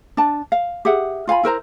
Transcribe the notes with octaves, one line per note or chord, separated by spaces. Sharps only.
D4 A5
F5
G4 G#4 E5 F#5
F4 F5 G#5 B5
E4 A#4 C5 A#5